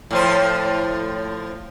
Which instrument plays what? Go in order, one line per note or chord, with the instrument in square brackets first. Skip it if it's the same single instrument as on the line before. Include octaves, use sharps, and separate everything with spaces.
[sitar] A2 F3 C5